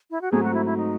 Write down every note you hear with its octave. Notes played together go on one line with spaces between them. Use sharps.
E4
F#4
G#2 F#3 A3 C4 G#4
F#4
E4
E4
D#4